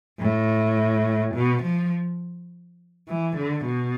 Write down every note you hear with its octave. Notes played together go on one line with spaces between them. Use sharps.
A2
B2
F3
E3
D3
B2